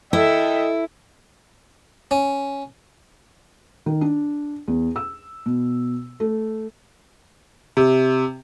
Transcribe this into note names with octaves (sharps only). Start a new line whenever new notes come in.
E4 A4 D#5 E5 G5
C#4
D#3
D4
E2
E6
B2
A3
C3